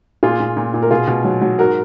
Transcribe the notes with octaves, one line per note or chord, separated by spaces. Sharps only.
A#2 F4 G#4
A#2
A#2
A#2
A#4
B2 F4 G#4
B2
F#3
F#3
G#2 F#4 A#4